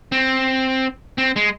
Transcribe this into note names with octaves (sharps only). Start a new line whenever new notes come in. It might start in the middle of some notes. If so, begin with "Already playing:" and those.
C4
C4
G#3